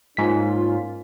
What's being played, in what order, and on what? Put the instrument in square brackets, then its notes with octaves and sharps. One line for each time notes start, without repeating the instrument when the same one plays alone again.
[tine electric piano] G#2 B6 [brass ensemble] A#3 C#4 F4